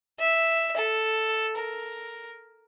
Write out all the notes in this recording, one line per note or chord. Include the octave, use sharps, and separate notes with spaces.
E5
A4
A#4